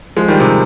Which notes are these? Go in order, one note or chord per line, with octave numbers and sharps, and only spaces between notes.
F3 G#3
D#3 G3
C3 D#3